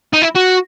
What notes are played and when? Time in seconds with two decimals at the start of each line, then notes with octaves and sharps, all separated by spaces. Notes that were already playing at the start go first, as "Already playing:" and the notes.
0.13 D#4
0.22 E4
0.36 F#4